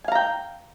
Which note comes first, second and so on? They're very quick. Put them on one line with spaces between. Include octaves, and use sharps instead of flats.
G#5 F5 A#5 G5